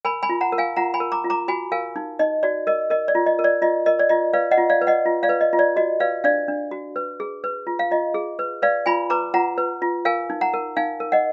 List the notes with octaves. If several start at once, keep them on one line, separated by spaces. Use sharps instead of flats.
A#4 G#5 B5
G#5 B5
F4
F#5 A#5
A#4
F5 G#5
F4 F#5 A#5
G#5 B5
A#4
A#5 D6
F4
A#5 D6
F#4 G#5 B5
A#4 F5 G#5
D#4
D#4 D#5
F#4 D5
A#4 D#5
A#4 D#5
D5
F4
D#5
A#4
D5
F4 D#5
A#4 D#5
D5
F4 D#5
B4 D5 F5
D#5 F#5
F4
D5 F5
B4
D#5 F#5
F4
D5 F5
B4
D#5
F4
D5
F#4 D#5
B4 D5 F5
D4 D5 F5
D4
F#4
B4
G#4
B4
F4
F5
F4 D#5
G#4
B4
B4 D5 F5
F4 G#5 B5
B4 A#5 D6
F4 F#5 A#5
B4
F4
A#4 F5 G#5
D#4
F#5 A#5
A#4
D#4 F5 G#5
A#4
D#5 F#5